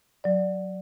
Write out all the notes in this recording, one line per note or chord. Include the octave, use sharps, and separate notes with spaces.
F#3 D5